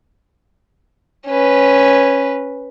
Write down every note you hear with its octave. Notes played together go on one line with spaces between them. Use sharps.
C#4 B4